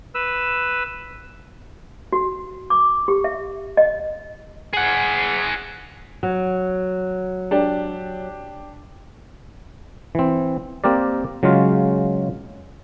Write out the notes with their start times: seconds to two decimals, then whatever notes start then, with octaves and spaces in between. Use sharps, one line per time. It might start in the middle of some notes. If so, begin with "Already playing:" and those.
0.15 B4 E6
2.12 F#4
2.70 D6
3.08 G4
3.24 E5
3.77 D#5
4.73 G#4 F#5
6.23 F#3
7.51 D4 G4
10.15 E3 C4
10.84 A#3 C4 G4 A#4 D5
11.43 C#3 F#3 G#3 C#4 F4